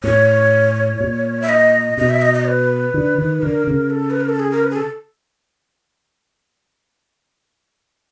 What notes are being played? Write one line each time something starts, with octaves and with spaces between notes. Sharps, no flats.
A2 C#5
A#2
E5
D#5
B2 D#5
E5
D#5
D#5
B4
D3
D#3
D3 A#4
C#3
A4
B4
A#4
A4
G#4
A#4
B4
G#4
A4